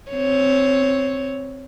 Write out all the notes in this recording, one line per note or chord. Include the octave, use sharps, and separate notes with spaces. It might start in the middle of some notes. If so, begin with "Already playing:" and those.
C4 C#5